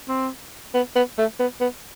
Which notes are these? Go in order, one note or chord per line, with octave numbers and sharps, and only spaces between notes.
C4
B3
B3
A3
B3
B3